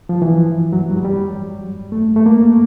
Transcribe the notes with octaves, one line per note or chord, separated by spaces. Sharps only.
F3
E3
F#3
G3
F#3
G3
A3
A3
A#3